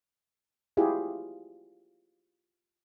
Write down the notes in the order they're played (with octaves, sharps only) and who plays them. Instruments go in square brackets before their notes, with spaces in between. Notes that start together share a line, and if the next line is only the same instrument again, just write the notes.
[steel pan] E4 F4 G4 G#4